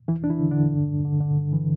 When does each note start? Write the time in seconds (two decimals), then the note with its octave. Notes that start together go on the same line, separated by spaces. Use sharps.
0.08 E2 E3 E4
0.24 E2 D4
0.30 E3 E4
0.40 D3
0.51 D3 D4
0.57 E2
0.72 G2
0.89 G2
1.05 D3
1.20 D3
1.37 G2
1.53 E3